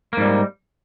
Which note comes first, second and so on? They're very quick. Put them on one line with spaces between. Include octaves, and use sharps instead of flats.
A#3 G#2 G3